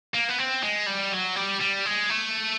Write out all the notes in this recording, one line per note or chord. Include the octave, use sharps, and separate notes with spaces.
A#3
B3
C4
G#3
G3
F#3
G3
G3
G#3
A3